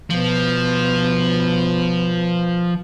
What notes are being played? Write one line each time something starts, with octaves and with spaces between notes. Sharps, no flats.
B2 F3 B3